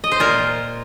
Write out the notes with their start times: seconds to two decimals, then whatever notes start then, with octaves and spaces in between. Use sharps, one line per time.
0.04 D#5
0.12 C5
0.19 A#2 F4 A#4